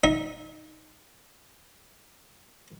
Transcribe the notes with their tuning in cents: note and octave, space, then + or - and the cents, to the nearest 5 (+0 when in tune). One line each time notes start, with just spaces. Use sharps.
D#4 +5 E5 -35